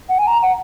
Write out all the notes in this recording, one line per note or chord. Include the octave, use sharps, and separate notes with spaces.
F#5
G#5
A#5
F#5